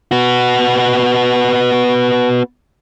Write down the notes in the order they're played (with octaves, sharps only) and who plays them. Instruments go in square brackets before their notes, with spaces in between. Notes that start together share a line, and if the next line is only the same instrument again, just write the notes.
[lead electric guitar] B3 F#4